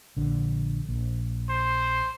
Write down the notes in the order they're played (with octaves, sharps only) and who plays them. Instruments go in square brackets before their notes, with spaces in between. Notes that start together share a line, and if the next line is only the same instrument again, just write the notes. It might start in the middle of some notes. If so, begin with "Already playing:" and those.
[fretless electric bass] A#1 D3
A#1
[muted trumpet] C5